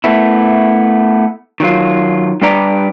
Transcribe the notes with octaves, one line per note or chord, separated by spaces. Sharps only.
A3 B3 E4
D#3 F#3 F4
G3 D4 B4 D5 A#5